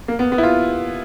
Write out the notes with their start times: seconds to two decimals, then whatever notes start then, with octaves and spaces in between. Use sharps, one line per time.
0.08 A#3
0.19 B3
0.32 B3
0.38 E4
0.43 F4